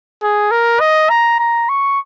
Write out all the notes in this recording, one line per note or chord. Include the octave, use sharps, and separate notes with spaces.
G#4
A#4
D#5
A#5
A#5
C#6